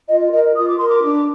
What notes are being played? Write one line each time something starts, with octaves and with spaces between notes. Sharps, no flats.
F4 D#5
A#4 D#5
F4 D#6
D6
A#4 C6
D6
D4